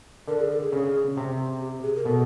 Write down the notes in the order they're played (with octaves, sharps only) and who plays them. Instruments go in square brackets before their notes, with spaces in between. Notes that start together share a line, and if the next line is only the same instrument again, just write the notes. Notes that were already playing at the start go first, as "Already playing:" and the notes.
[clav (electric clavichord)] D3 [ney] A#4
[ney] G#4
A4
G#4
[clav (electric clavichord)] C#3 [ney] G#4
[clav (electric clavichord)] C3
[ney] G4
G#4
A#4
[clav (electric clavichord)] B2 [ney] A4